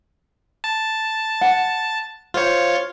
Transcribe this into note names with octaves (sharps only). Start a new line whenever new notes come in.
A5
F#5
F4 C5 C#5 F5